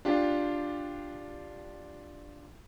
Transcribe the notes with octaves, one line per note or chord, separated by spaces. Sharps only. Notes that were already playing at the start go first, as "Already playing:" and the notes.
D4 F4 G4